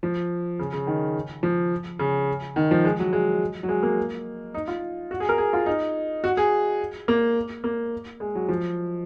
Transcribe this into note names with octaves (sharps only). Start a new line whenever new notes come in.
F3
C#3
C#3
D#3
F3
C#3
D#3
F3
G#3
F#3
G#3
F#3
G#3
A#3
D#4
F4
F#4
G#4
A#4
G#4
F4
D#4
F#4
G#4
A#3
A#3
G#3
F#3
F3